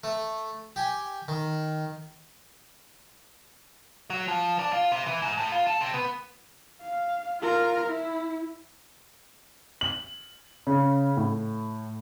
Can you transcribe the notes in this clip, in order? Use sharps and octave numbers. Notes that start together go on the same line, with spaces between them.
A3
G4 G#5
D#3
F#3
F3
D4
F4
C3
E3
G#2
A2
F4
A4
C3
B3
F5
F4 A#4
E4
F#7
C#3
A2